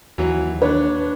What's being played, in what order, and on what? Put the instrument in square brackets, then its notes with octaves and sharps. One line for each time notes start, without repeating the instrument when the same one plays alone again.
[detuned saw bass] D#2 [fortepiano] E3 F#3
[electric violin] D4 [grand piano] B4 [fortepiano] C#5